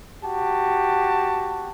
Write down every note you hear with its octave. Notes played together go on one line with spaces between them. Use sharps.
F#4 G4 A5